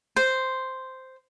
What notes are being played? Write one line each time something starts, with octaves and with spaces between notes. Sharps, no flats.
C5